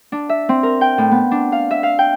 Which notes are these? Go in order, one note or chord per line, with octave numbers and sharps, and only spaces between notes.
D4
E5
C4
A#4
G5
A2
B3
D4
F5
E5
F5
G5